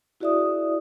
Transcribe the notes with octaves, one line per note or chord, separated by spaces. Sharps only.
E4 F#4 G#4 D5 E5 D#6